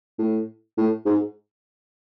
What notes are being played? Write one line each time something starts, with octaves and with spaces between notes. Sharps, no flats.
A2
A2
G#2